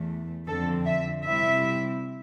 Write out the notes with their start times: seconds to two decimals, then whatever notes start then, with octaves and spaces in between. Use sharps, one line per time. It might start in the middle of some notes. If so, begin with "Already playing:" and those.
Already playing: E2 E3 A3
0.47 F2 D3 F3 C4 A4
0.85 E5
1.25 C3 G3 C4 E4 E5